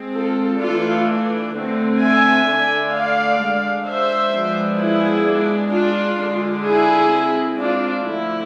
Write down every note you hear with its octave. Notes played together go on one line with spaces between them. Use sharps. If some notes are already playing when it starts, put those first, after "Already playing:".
Already playing: G#3 C4
F4 A4
E3 A3 D4 F4 A4
D3 A3 C4
E5 G#5
D3 A3 D4
D5 F5
G#3 D4
C5 E5
F3 G#3 B3 D4
E4 G#4
G#3 D4
D4 F4
D3 G#3 D4
E4 G#4
G#3 C4
D4 F4
D3 F3 A3 E4